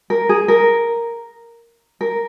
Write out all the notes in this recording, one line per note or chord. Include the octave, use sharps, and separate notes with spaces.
A#4
G#4
A#4
A#4